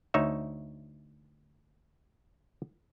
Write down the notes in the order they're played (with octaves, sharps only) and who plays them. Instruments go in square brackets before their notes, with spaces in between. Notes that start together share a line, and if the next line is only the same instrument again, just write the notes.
[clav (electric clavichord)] D2 D#4 C#5 E5